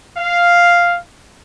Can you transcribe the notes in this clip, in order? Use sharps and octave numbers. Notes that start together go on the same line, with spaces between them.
F5